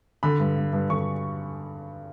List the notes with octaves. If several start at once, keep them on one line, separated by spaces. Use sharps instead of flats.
D3 B5
G2
G2
G2
D3 C#6